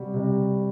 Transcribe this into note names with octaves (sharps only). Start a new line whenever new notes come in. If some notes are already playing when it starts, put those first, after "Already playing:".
Already playing: C3 G3 F#4
C3 G3